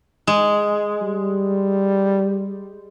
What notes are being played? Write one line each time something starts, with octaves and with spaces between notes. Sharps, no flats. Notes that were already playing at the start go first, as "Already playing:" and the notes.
G#3
G3